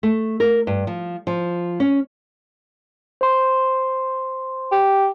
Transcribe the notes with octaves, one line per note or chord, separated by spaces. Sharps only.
A3
A#4
G2
F3
F3
C#4
C5 C6
G4